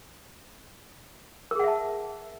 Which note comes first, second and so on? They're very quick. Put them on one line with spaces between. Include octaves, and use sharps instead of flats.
A#4 G#4 F#5 E5 A5